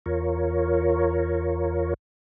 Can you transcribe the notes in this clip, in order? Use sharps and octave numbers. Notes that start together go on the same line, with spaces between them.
E2 F4 A#4 C#5